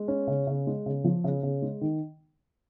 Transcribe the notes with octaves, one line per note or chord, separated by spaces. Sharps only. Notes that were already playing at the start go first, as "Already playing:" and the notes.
Already playing: G#3
C#4
C#3
C#3
G#3
C#3
F3
C#3
C#3
G#3
D#3